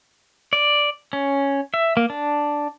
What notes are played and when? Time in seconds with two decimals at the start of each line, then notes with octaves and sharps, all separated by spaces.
0.53 D5
1.13 C#4
1.74 E5
1.97 A#3
2.10 D4